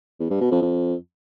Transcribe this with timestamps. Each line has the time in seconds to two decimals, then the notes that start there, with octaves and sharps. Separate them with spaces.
0.20 E2
0.30 G2
0.41 B2
0.51 F2
0.62 F2